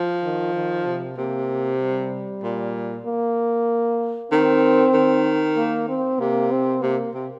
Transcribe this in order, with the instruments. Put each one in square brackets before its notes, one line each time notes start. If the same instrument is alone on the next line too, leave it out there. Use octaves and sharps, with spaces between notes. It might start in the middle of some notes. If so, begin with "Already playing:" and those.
Already playing: [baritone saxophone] F3
[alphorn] D#3
D#3
C3
[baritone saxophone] C3 [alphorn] A#3
[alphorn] G3
[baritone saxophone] A#2
[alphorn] A#3
[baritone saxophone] D#3 [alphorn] C4
[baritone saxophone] D#3
[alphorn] A#3
C4
[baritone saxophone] C3 [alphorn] A#3
[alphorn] C4
[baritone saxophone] C3 [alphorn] A#3
[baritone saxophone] C3